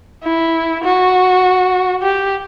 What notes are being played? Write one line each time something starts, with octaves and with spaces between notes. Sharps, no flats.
E4
F#4
G4